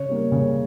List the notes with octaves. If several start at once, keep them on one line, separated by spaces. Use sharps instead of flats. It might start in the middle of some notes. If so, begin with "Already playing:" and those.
Already playing: C#3 C#5
G3 A#3
C#3